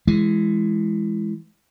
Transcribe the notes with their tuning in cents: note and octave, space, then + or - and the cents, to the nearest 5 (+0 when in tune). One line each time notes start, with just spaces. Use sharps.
E3 +15 G#3 +0